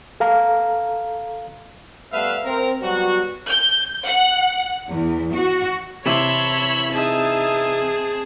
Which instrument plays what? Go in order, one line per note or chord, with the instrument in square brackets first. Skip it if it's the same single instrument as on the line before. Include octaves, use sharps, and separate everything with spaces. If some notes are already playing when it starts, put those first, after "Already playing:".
[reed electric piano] A4 F5 A#5
[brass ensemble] G3 A3 B3 B4 E5 F5
C4 A#4
F#3 G3 B3 F#4
[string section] G6
F#5
E2
F#4
[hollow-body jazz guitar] C3 E3 E4 [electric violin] C#5 E5 [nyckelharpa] A5 C6 [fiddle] B5
[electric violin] C4 G#4 [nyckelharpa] D#4 E5 [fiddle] A5